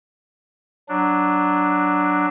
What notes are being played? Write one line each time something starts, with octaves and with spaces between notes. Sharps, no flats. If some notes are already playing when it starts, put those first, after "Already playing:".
F#3 D4